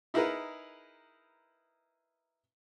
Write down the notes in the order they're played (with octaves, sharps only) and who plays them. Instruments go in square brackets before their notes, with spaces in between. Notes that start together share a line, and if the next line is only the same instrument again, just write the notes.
[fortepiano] D#4 E4 G#4 A#4 B4